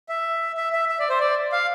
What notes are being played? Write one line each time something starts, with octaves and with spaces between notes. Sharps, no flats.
E5
E5
E5
E5
D5
C5
D5
F5